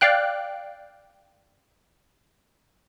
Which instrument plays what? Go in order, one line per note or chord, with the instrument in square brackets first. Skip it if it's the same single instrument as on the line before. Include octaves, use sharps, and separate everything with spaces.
[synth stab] D5 F5 G5 F#6